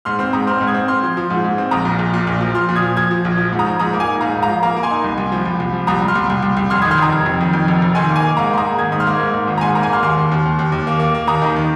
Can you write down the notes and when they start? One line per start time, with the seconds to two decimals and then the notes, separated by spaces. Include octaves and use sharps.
0.05 G#2 C6 F6
0.19 C4 C6 F6
0.33 G#2 A#5 D#6
0.47 C4 C6 F6
0.58 G#2 F6
0.67 D#6 G#6
0.74 C4
0.88 C4 C6 F6
1.03 F3
1.17 F3
1.30 G#2
1.44 G#2
1.58 C4
1.71 A#1 A#5 D#6
1.85 A#2
1.99 A#1
2.14 A#2
2.27 A#1
2.41 F3
2.54 F3 C6 F6
2.69 A#2
2.76 D#6 G#6
2.82 F3
2.97 F3 D#6 G#6
3.11 F3
3.25 A#1
3.38 F3
3.52 G#2
3.59 A#5 D#6
3.66 F3
3.79 G#2 A#5 D#6
3.93 A#3
4.00 G#5
4.07 D#4
4.21 G#2 F5 A#5
4.36 G#2
4.42 F5 A#5
4.49 F3
4.62 A#3 F5 A#5
4.77 A#3
4.83 G#5 C6
4.91 D#4
5.04 C2
5.18 C2
5.32 F3
5.46 C2
5.60 C2
5.73 F3
5.87 C2 A#5 D#6
6.02 C2
6.08 C6 F6
6.15 C2
6.30 C2
6.43 C2
6.57 C2
6.70 F1 C6 F6
6.82 D#6 G#6
6.85 D#3
6.91 C6 F6
6.98 F1 A#5 D#6
7.13 F1
7.26 F2
7.40 D#3
7.53 F2
7.68 F1
7.82 F1
7.95 D#3 G#5 C6
8.09 A#3
8.16 G#5
8.23 A#3
8.37 G#2 F5 A#5
8.51 A#3 C6
8.58 A#5 D#6
8.65 G#2
8.78 D#3 D#6 G#6
8.92 G#2 D#6
9.00 C6 F6
9.07 A#3
9.20 G#2
9.33 G#2
9.47 G#1
9.58 A#5
9.61 G#2 G#5 C6
9.75 A#3 A#5
9.83 G#5
9.89 A#3 C6 F6
10.03 D#2 C6 F6
10.17 D#2
10.32 D#2
10.46 D#2
10.59 D#2
10.72 D#2
10.87 A#3
11.00 A#3
11.14 A#3
11.27 D#2 A#5 D#6
11.42 D#3
11.56 D#3